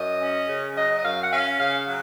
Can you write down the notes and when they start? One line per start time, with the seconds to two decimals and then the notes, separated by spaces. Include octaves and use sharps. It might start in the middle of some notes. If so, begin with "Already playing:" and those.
Already playing: F#2 D#5
0.21 C#4
0.49 C#3
0.76 F#3 D#5
0.98 D#5
1.04 F#2 F5
1.24 F#5
1.31 C#4 F5
1.59 C#3 F5
1.87 F#3